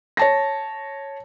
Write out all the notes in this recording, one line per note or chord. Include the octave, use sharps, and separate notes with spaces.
C#5 A5 A#6